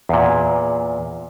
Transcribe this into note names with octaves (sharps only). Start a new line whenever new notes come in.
E2 A#2